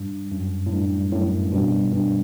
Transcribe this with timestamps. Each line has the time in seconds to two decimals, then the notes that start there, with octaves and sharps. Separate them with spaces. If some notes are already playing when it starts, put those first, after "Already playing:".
Already playing: G2
0.32 F#2
0.66 A2
0.72 G2
1.12 F#2 A2
1.53 G2 B2
1.93 G2